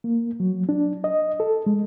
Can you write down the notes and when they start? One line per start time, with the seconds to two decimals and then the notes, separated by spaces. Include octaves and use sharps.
0.04 A#3
0.40 F#3
0.69 D4
1.04 D#5
1.40 A4
1.66 G#3